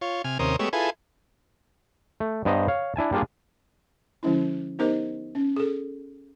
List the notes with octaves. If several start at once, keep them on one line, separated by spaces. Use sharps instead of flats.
F4 C#5
C3 G#5 F6
D#2 C3 C#4 A#4 C5 D#6
G#3 A3 B3 G4 C#5 E6
E4 F4 G#4 A4 B4 G#5
A3
G2 B3 C5 D#5 A#5
C#5 F5
D4 E4 G#5 A5
G3 A#3 D4 F4 G#4
D3 F3 G#3 C#4 E4
B3 D#4 G4 A#4 C5 D#5
C#4
G#4 A4